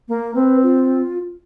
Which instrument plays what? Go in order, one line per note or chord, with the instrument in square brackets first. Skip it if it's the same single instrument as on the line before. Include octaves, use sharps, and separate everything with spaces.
[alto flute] A#3
[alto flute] C4 [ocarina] B4
[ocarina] F4